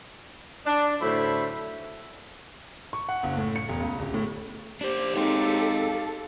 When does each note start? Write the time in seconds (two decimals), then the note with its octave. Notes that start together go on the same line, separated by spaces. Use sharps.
0.65 D4
1.02 A2 D3 F#3 C5 E5 B5
2.93 C#6
3.09 F#5
3.23 F#1
3.37 A2
3.56 C#7
3.69 E1
3.80 C#2
3.99 D1
4.14 A2
4.81 D4 G4 C5
5.16 G#3 C4 D#4 A4 C#5 F5 G5